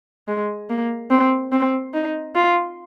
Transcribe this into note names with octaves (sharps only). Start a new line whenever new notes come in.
G#3
A#3
C4
C4
D#4
F4